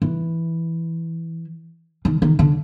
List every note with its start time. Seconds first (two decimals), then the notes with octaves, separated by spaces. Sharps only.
0.02 E3
2.05 D#3
2.22 D#3
2.39 D3